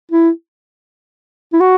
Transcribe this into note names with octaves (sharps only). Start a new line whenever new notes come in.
E4
E4
F#4